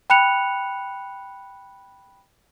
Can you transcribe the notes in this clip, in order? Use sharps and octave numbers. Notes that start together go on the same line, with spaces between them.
G5 B5 F#6 C#7 F7